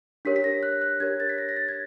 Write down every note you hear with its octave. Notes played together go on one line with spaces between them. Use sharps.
D4 G4 A#4 C#5 B6
B6
A#6
F#6
F#6
D4 G4 A#4 C#5 G#6
A6
B6
A#6
A#6
A6
G#6